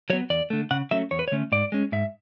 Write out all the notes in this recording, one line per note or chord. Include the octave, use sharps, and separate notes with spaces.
F#3 B3 C#5
E2 D5
D3 A3
C#3 F#5
F#3 A3 C#4 E5
E2 C#5
B4
C#5
D3 A3 C#4
G#2 D5
G#3 C#4
G#2 E5